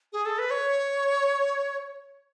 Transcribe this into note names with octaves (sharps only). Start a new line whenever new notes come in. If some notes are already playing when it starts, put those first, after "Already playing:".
G#4
A4
B4
C#5